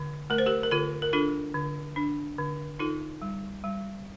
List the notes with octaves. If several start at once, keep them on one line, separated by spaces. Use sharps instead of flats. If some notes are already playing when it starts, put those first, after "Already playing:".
Already playing: D3
A3 A#4
C5
G4 A#4
A#4
D3 F4 A4
A#4
D4 F4 A4
D3
D4
D3
D#4 F4 A4
G3
G3